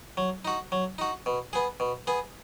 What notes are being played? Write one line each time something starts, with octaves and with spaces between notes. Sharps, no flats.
F#3
D#4 F#4
F#3
D#4 F#4
B2
B3 G#4
B2
B3 G#4